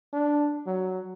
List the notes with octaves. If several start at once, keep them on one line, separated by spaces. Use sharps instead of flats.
D4
F#3